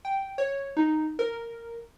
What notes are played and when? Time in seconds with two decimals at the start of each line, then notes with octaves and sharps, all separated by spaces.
0.05 G5
0.38 C#5
0.77 D#4
1.19 A#4